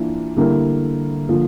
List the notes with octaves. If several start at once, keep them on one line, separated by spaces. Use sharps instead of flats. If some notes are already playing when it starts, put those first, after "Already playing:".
Already playing: E3 A#3 D4 F4
D3 G3 A#3 E4 A#4
D3 F3 A#3 F4